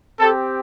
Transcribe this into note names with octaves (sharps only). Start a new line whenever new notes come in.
C4 G4 A4